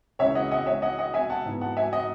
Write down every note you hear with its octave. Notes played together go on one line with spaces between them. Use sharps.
C#2 C#3 E3 C#5 E5
D#5 F#5
D#5 F#5
C#5 E5
D#5 F#5
D#5 F#5
E5 G#5
F#5 A5
G#2 E3 B3
F#5 A5
E5 G#5
D#5 F#5